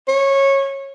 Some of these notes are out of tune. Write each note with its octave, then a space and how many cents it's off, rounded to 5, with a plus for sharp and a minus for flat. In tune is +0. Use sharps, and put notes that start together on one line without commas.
C#5 -15